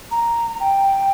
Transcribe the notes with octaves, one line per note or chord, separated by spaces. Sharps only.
A#5
G5